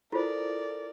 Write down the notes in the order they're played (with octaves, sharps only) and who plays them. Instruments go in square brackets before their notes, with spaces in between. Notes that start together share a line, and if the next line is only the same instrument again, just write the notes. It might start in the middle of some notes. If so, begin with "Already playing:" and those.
[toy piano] E4 F4 C5 [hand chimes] A4 [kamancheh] A#4 D5